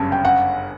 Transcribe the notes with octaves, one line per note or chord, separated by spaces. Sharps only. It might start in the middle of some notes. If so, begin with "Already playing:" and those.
Already playing: G1 F#2 C#3 G3 C#4 A5
G5
F#5